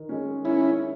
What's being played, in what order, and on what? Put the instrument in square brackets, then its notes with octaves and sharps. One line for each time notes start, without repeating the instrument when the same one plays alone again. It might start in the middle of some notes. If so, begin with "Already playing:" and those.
Already playing: [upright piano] D#3
G#3 C#4
[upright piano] D#3 [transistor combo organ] C#4 E4